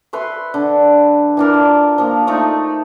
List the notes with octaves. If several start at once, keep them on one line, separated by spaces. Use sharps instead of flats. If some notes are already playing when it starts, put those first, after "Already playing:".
B4 E5 C6 C#6
D3
E3 D4 A#4
F4
F3 A#3
A3 D#4 C#6